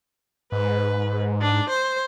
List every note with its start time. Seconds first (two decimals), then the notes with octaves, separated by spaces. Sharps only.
0.52 G#2 B4
1.41 D4
1.69 C5